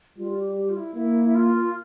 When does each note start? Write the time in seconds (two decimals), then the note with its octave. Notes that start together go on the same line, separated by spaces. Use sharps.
0.18 G3 F4
0.38 G4
0.57 G4
0.69 F4
0.77 E4
0.95 A#3 E4
1.25 E4
1.35 F4